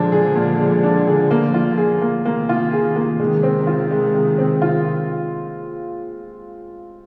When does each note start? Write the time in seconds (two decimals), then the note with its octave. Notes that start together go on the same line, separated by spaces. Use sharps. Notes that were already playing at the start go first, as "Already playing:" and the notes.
Already playing: A#2 D3 F3 G#3 D4
0.12 G#4
0.35 A#2
0.60 G#3
0.83 D4
1.07 G#4
1.31 A#3
1.54 F4
1.78 G#4
2.02 A#3
2.25 C3 D#3 A#3
2.49 F4
2.73 G#4
2.96 A#3
3.20 C3 D#3 G#3
3.43 C4
3.67 F4
3.91 G#3
4.14 G#3
4.38 C4
4.62 F4